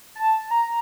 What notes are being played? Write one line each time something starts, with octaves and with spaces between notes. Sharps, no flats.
A5
A#5